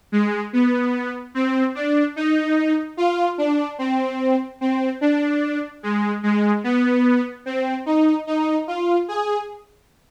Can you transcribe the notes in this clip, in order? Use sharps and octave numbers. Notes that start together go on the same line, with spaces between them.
G#3
B3
C4
D4
D#4
F4
D4
C4
C4
D4
G#3
G#3
B3
C4
D#4
D#4
F4
G#4